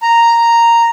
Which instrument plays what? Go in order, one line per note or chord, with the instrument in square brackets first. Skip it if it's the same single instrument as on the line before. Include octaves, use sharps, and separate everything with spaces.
[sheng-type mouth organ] A#5